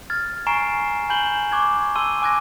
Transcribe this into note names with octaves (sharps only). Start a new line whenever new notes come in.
F6 G#6 A6
G#5 A#5 C#6 C7 D7 E7
G#5 B5 G6 E7 F#7 G7
C#6 D6 F#6 G#6
A5 C6 E6 D#7 G7
G#5 D6 F#6 G#6 A#6